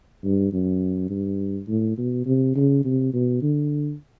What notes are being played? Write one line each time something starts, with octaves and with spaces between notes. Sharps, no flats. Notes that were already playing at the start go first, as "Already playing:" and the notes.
G2
F#2
G2
A2
B2
C3
C#3
C3
B2
D3